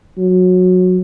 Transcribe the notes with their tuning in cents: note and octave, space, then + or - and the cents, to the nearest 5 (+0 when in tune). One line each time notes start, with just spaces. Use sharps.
F#3 -20